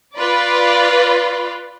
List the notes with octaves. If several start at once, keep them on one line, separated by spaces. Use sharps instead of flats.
F4 B4 D5